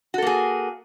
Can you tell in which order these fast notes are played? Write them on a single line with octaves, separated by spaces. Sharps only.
F#4 A4 A#3 G#4